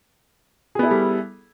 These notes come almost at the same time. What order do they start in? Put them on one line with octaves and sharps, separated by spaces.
G#4 B3 E4 A4 G3